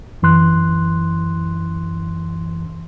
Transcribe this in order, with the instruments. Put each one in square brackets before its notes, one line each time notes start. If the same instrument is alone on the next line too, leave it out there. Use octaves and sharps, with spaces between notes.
[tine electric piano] F#2 E3 C6 F#6